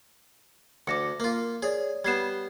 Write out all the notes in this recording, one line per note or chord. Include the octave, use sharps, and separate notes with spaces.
D2 D6 A#6 C#7
A#3 F4
G#4 C#5 D5
G3 B3 G#6 C7 E7